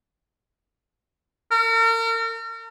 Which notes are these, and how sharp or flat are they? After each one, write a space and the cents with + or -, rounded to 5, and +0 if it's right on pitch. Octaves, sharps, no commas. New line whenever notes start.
A#4 -40